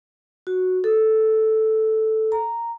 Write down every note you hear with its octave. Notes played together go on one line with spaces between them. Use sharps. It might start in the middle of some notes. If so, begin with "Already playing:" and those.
F#4
A4
A#5